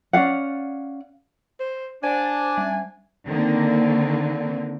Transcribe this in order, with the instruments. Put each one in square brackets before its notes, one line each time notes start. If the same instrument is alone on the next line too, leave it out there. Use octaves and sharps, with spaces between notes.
[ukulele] C#4 D5 F5 F#5
[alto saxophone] C5
[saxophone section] D4 [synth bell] C5 [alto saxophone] G#5
[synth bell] G3
[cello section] D3 D#3 A#3 C4